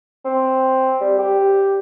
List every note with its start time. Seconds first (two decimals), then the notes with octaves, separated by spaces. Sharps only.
0.25 C4
1.01 G3
1.19 G4